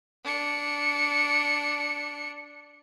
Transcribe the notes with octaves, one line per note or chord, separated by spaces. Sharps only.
D4 C#7